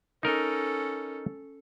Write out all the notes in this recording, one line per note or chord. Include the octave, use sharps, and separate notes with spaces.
C#4 D#4 A4 A#4 D#5